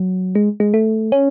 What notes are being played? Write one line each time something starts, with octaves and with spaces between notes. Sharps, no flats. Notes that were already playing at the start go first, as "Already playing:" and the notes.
Already playing: F#3
G#3
G#3
A3
C#4